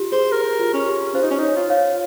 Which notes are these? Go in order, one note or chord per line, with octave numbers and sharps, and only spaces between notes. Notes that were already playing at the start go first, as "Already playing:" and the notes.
Already playing: F4 G4
G#4 C5
G4 A#4
F4
C#4
G4
F4 C5
D#4
C#4
D#4 C#5
F4
C#5 F5